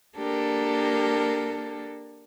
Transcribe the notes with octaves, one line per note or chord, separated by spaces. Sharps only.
A#3 D4 G4 A4 A#4